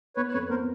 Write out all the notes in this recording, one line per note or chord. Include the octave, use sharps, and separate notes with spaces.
B3 B4 C#5
F2 B4 C#5
B3 A#4 C5